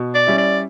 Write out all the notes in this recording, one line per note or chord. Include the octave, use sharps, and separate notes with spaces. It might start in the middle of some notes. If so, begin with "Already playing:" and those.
Already playing: B2
D5
G3 C#4 E4
D5